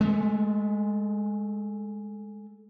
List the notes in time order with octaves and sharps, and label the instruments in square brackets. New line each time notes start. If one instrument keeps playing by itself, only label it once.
[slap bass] G#3 A3